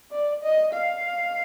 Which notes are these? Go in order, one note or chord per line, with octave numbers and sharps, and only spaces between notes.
D5
D#5
F5